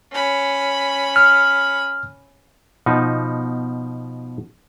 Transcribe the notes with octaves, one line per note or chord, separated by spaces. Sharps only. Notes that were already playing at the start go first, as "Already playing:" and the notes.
C#4 B5
F6
B2 F3 D#4